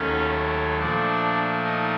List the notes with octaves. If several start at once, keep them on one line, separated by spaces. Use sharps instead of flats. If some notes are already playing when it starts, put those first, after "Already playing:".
Already playing: D#2 D#3 F#3 A3 C#4
A#2 F3 A3 D4
D#4